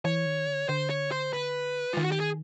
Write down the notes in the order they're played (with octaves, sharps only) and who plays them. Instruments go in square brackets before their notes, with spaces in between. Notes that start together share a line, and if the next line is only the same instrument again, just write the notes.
[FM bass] E3 [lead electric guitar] C#5
[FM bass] D#3
D3
[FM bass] D3 [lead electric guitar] C5
[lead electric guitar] C#5
C5
B4
[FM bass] D#3 [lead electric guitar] F4
[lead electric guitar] F#4
G4
G#4